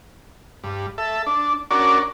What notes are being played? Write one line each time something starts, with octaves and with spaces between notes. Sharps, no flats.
G2
A4 E5
D4
C#4 D4 F#4 A#4 D5